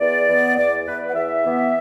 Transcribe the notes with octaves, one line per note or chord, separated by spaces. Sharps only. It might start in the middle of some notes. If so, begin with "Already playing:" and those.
E2 D5
E3 B3
E2 D5
E3 B3 B4
B4
F#5
E2 E5
E3 B3